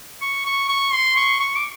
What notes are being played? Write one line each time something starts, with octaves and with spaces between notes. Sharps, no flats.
C#6
C#6
C#6
C6
C#6
C#6
D6